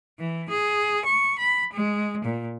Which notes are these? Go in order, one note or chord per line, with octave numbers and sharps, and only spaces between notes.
E3
G#4
C#6
B5
G#3
A#2